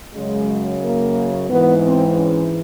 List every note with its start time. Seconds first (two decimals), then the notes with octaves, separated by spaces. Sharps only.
0.15 F#2 C#3 F#3 G#3
0.82 A#3
1.50 G#2 E3 B3
1.84 C4
2.17 C#4